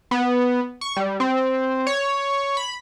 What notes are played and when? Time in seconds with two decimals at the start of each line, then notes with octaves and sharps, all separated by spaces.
0.11 B3
0.81 C#6
0.97 G3
1.20 C4
1.87 C#5
2.57 B5